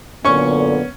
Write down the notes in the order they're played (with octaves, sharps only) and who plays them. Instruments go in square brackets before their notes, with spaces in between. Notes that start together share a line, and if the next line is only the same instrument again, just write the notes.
[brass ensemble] F#2 A#2 D3 [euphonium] B3 [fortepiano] C#4 C#6